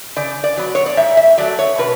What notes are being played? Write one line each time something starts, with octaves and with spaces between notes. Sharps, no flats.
C#3 D5
D5
F#3 B3
C#5
D5
G#2 E5
E5
F#3 A3 D5
C#5
B2 B4